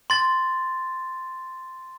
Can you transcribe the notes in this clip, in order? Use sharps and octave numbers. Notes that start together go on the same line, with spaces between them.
C6 A6